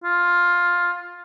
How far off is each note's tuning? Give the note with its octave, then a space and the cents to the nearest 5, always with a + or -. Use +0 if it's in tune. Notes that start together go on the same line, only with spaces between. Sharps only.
F4 +10